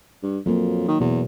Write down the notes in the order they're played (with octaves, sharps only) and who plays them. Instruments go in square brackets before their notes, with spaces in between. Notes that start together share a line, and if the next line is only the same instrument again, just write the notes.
[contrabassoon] G2
[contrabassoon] F2 [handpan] F#3 A#3
[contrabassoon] D#3
[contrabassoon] E2 [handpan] B2